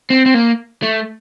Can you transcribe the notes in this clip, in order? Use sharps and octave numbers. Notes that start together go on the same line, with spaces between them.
C4
C4
A#3
A3